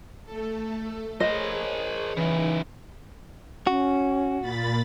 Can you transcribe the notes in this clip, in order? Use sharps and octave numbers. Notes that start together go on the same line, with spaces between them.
A3 A4
G#4 A#4 C5 C#5 D#5
C#3 E3 D#4 E4
C#4 F#4
A#2 B5 A6